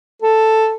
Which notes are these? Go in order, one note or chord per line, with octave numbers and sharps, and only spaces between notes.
A4